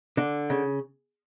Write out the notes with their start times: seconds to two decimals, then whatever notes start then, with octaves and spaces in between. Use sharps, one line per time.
0.17 D3
0.50 C#3